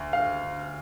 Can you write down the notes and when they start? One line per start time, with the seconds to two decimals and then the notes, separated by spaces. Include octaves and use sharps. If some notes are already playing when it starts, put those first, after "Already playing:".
Already playing: D2
0.13 F5